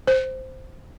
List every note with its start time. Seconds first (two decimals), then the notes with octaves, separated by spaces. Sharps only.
0.07 C5